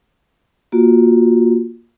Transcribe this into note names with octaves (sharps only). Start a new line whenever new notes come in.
A#3 F4 F#4